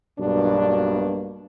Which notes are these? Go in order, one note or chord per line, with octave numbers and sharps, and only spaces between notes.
B1 G2 B2 A#3 D4